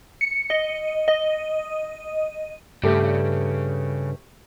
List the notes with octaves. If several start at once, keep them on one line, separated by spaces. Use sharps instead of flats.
C#7
D#5
D#5
G2 C#3 A3 G4